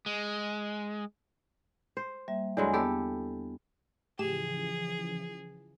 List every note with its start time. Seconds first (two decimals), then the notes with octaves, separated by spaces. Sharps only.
0.06 G#3
1.97 C5
2.28 G3 A#3 E5
2.57 E2 D3 F#3 G#3 G#5 B5
2.74 B3 G4 A4
4.19 A2 C#3 E3 F3 G4 G#4 E7